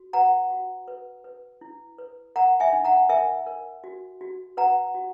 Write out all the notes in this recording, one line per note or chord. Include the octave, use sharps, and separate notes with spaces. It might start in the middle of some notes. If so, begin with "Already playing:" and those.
Already playing: F#4
B4 F#5 A#5
F#4
B4
B4
E4
B4
A#4 F#5 A#5
E5 G#5
D#4
F#5 A#5
A#4 E5 G#5
A#4
F#4
F#4
B4 F#5 A#5
F#4